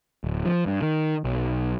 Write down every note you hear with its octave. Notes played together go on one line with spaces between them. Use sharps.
D1
F3
G2
D#3
B1